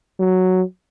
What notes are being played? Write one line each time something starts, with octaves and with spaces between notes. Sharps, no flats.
F#3